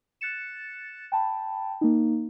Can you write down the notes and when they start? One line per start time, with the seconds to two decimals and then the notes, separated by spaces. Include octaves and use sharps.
0.21 F#6 A6 C#7 E7
1.12 G5 A5 B5
1.81 A#3 D#4